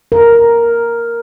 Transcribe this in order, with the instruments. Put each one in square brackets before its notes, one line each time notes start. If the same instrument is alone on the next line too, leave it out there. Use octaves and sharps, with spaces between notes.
[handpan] A#4